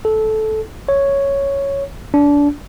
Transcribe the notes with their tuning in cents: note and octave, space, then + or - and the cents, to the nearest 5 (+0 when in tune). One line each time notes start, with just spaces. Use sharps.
A4 -15
C#5 +0
D4 -25